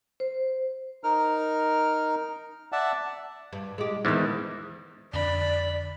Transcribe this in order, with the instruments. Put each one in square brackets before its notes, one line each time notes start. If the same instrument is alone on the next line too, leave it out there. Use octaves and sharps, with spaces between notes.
[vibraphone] C5
[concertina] D#4 A#4 F6
D5 E5 F#5 A5
[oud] G2
G#3 G4
[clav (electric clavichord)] E2 G#2 [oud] D#3 C4 E4
[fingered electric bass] F2 D3 D4 [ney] D5 [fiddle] B5